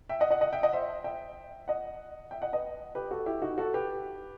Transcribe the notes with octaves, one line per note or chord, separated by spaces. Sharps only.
E5 G5
D#5 F#5
D#5 F#5
D#5 F#5
E5 G5
D#5 F#5
C5 E5
E5 G5
D#5 F#5
E5 G5
D#5 F#5
B4 D#5
G4 B4
F#4 A4
E4 G4
D#4 F#4
F#4 A4
G4 B4